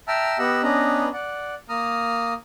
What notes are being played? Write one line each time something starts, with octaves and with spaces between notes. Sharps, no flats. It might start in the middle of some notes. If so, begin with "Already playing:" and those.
E5 G5 A5 A#5 E6 F6
B3 G4 D#5 F#5 E6
B3 C#4 D4 B4 D#5 A#5
D5 F#5
A#3 A#5 D#6 F6